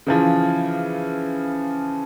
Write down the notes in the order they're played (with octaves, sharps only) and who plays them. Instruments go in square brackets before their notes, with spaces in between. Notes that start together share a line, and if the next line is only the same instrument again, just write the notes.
[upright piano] C#3 E3 F3